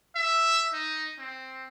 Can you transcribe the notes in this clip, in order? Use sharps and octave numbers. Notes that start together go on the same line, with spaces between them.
E5
D#4
C4